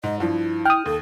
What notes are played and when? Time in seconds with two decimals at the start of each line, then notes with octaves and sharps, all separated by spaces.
0.04 G#2 D#5
0.20 G2 F3 E4
0.65 G5 D#6 F6
0.86 D#2 A4